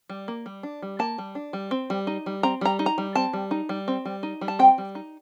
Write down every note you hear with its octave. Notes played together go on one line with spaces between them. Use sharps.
G3
A#3
G3
D4
G3
A#3 A5
G3
D4
G3
C4
G3
D#4
G3
C4 A#5
G3 A#5
D#4
A#5
G3
C4 A5
G3
D#4
G3
C4
G3
D#4
G3
A5
C4 G5
G3
D#4